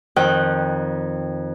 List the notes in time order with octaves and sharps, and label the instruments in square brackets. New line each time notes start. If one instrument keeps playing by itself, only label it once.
[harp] F2 D#3 G5 F#6